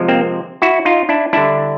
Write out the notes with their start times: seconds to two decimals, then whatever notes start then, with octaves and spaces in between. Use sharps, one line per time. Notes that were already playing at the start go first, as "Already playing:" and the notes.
Already playing: C3 F3 G#3
0.08 A#3 C4
0.62 E4 F#4
0.85 D#4 F4
1.09 D4 E4
1.33 D3 G3 D4 E4